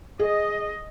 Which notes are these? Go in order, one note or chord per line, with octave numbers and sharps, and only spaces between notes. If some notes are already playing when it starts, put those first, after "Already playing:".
G#4 D#5